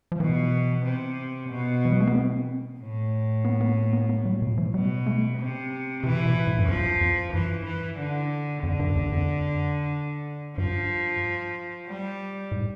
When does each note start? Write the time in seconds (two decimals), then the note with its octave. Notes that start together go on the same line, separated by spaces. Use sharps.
0.12 F3
0.20 B2 E3
0.85 C3
1.50 B2
1.85 F3
1.92 G3
2.00 A3
2.07 B3
2.15 C4
2.80 A2
3.45 B3
3.61 B3
3.93 B3
4.09 B3
4.25 G3
4.42 B2
4.58 F3
4.74 B2 G3
5.06 A3
5.39 C3
6.04 C3 E3
6.26 B2
6.47 A2
6.59 G2
6.68 F2 F3
7.01 F2
7.33 G2 E3
7.66 E3
7.98 D3
8.63 F2 D3
8.79 G2
8.96 E2
9.12 F2
10.57 G2 F3
11.87 G3
12.52 A2